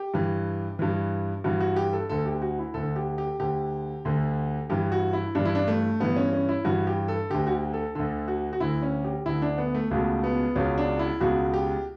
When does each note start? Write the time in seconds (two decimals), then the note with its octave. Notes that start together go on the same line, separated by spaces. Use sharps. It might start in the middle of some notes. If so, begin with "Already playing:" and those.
Already playing: G4
0.14 G2 E3
0.79 G2 E3
1.44 G2 E3 F#4
1.60 F#4
1.76 G4
1.93 A4
2.09 D2 D3 A4
2.26 G4
2.42 F#4
2.59 E4
2.74 D2 A4
2.79 D3
2.96 G4
3.18 G4
3.40 D2 D3 G4
4.05 D2 D3
4.70 G2 E3 G4
4.92 F#4
5.13 E4
5.35 G2 E3 D4
5.45 E4
5.55 D4
5.67 A3
6.00 G2 E3 B3
6.16 C#4
6.33 C#4
6.49 E4
6.65 G2 E3 F#4
6.87 G4
7.08 A4
7.30 D2 D3 G4
7.47 F#4
7.52 G4
7.73 A4
7.95 D2 D3 A4
8.28 F#4
8.53 F#4
8.60 D2 D3 E4
8.82 C#4
9.04 G4
9.26 D2 D3 E4
9.42 D4
9.58 B3
9.74 A3
9.90 C#2 B2 A3
10.24 B3
10.56 C#2 B2 C#4
10.78 D4
10.99 E4
11.21 C#2 B2 F#4
11.54 G4